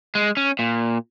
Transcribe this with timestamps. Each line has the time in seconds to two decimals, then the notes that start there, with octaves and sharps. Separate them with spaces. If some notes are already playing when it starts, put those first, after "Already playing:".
0.15 G#3
0.37 C#4
0.59 A#2